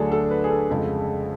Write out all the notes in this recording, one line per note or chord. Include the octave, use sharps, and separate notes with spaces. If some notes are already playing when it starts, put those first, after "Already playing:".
Already playing: D2 D3 F#3 A3 D4 G#4 A4
A4
B4
G#4
A4
F2 C#3 G#3